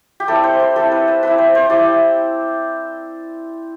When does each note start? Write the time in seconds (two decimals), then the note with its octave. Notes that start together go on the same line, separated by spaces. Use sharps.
0.20 G4
0.28 G3 C4 E4 A4
0.44 C5
0.60 C5
0.76 G3 C4 E4 A4
0.91 B4
1.08 C5
1.22 G3 C4 E4 B4
1.38 C5
1.55 C5
1.70 G3 C4 E4 D5